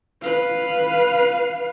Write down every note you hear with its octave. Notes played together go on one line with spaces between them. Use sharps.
B4 F5